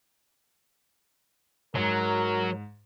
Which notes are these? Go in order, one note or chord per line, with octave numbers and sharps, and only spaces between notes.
G#2 F#3 A#4